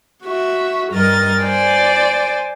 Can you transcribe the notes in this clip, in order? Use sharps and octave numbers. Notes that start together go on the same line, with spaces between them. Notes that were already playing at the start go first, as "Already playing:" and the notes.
F#4 E5
G2 A#4 D#5 A6
C5 D5 G#5